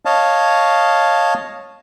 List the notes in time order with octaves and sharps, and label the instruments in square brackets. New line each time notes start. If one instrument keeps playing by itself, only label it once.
[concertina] C#5 D#5 F5 A5